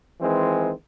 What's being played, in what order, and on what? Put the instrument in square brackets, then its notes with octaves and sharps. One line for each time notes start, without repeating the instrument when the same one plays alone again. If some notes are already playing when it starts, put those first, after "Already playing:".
[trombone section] D#3 E3 G#3 C4